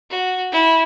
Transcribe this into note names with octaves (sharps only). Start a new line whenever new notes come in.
F#4
E4